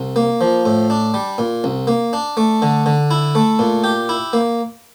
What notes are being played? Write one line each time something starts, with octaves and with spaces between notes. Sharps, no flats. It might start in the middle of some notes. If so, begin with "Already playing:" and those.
Already playing: C2
A#3
F3
A2
D4
G3
A#2
C2
A#3
D4
A3
D3
D3
E4
A3
A#2
G4
E4
A#3